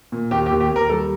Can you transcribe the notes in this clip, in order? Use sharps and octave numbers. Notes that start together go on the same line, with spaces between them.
A#2
D#2 G4
G4
D#2
G4
D#2
A#4
G3 A4